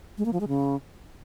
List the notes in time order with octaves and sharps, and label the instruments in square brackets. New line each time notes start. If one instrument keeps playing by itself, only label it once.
[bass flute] G#3
A#3
F3
G#3
C#3